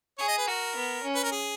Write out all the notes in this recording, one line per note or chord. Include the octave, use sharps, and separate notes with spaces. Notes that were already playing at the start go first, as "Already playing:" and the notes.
G#4 C#5
D#5
B4
F#4 A#4
B3
C#4
B4
A#4
G#4